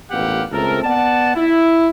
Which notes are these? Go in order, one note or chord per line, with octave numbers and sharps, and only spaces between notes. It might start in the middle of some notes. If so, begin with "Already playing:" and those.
A1 A#2 B3 G4 F5 F#5
C#2 A3 C4 A4 A#4
B3 D5 F#5 A5
E4